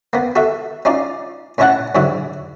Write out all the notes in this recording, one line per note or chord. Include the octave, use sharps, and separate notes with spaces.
A#3 B3
F#4 A4 E5
C#4 D#4 F4 D5
A2 C#4 E4 C#5 F#5 A5
G#2 D3 F#3 E4 F#4